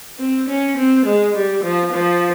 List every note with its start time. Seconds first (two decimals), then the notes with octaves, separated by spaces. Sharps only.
0.19 C4
0.48 C#4
0.77 C4
1.05 G#3
1.34 G3
1.63 F3
1.92 F3